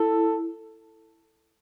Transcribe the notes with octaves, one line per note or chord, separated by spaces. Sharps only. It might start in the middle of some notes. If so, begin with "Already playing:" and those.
Already playing: E4 A4